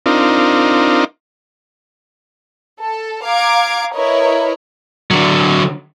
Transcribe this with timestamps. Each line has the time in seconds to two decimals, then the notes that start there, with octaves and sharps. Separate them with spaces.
0.06 C4 D4 D#4 F4 A#4
2.79 A4
3.24 F5 A#5 D6 G#6 D7
3.94 E4 A#4 B4 C#5 D#5
5.11 D3 F#3